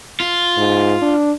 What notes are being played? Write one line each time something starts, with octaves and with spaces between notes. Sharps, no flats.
F4
G#2
D4